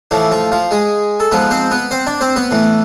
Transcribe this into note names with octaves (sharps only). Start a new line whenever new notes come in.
A2 E3 F3 E4
F3 F4
F3 F4
G#3 G#4
A4
G#2 F3 B3 B4
C4 C5
B3 B4
C4 C5
D4 D5
C4 C5
B3 B4
A2 E3